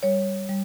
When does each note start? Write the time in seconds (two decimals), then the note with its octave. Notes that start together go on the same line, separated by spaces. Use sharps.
0.03 G3 C#5
0.49 G3